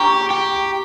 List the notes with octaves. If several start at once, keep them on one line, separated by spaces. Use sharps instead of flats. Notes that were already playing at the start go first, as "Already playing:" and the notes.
Already playing: G4 A#5 C#6
G4